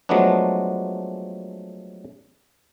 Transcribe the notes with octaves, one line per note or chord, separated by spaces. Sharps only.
F3 F#3 G#3 A3 B3 D4